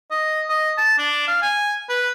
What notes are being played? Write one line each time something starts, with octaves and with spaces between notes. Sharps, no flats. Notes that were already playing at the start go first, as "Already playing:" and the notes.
D#5
D#5
A5
D4
F5
G#5
B4